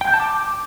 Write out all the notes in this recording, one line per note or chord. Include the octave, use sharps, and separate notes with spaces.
G5
G6
A5
D6